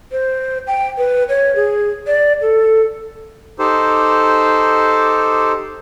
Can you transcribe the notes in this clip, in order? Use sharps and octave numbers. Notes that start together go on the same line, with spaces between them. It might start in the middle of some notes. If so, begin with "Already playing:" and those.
C5
G5
B4
C#5
G#4
D5
A4
D#4 G4 A4 C5